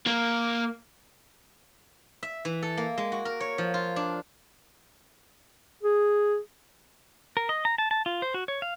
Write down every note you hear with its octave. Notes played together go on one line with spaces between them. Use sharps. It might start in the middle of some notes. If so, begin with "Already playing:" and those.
A#3
E5
E3
A4
A#3
G#3
F#4
A#4
C#5
F3
F4
D4
G#4
A#4
D#5
A#5
A5
A5
F4
C5
F#4
C#5
F5